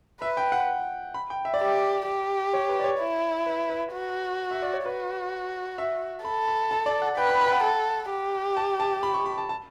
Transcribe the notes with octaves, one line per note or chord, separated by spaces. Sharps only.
B4 E5
G5
F#5
B5
G5
E5
D5
G4 E5
G4
C#5
B4
D5
C#5
E4
B4
B4
F#4
E5
D5
C#5
F#4 B4
E5
A4 B5
B5
A5
D5
F#5
B4 G5
B5
B5
G5
F#5
A4
G4
A5
A5
B5
C#6
B5
A5
A5